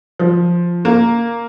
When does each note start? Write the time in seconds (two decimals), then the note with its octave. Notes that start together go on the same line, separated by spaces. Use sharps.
0.19 F3
0.85 A#3